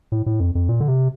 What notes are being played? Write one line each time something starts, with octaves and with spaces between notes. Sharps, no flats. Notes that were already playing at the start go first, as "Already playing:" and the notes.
A2
A2
F2
F2
A#2
D3
C3